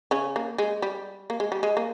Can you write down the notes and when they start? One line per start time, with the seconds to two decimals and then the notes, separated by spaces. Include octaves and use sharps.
0.11 C#3 C#4
0.36 A#3
0.58 G#3
0.82 G3
1.30 A#3
1.40 G#3
1.52 G3
1.63 G#3
1.77 A#3